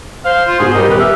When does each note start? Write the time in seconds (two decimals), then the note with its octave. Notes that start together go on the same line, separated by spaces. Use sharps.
0.25 C5 F5
0.47 F4
0.60 G#2 B2 G#4
0.75 G3 D#4 G4 A#4
0.88 D#1 B3 G4 F#6
1.00 G4 E5 F6